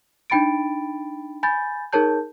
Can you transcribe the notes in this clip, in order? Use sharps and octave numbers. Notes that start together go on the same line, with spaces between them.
D4 D#4 G5 B5 A6 D7
G#5 B5 G6 A6
D#4 G#4 A#4 C#5 A5 G6